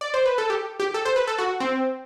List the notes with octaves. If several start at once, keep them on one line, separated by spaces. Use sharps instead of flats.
D5
C5
B4
A4
G4
G4
A4
C5
B4
A4
F#4
C4